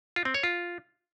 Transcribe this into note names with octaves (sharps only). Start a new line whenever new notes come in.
F4
C4
C#5
F4